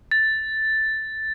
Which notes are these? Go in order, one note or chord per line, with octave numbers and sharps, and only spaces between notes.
A6